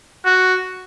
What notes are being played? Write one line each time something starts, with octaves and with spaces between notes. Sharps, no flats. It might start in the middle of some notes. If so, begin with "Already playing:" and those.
F#4